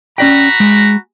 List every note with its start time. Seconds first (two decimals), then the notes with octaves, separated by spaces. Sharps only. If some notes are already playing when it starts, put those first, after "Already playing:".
0.18 C#4 F#4 D5 G5 A#5 B5
0.60 G#3